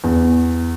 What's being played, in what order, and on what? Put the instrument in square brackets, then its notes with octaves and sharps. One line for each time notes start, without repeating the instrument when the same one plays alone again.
[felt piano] E2